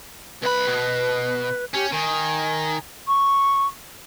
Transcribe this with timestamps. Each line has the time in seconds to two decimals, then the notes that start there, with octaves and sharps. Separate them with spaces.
0.42 C2 B4 B5
0.67 B2
1.74 C#4 G4
1.93 D#3 G#5
3.08 C#6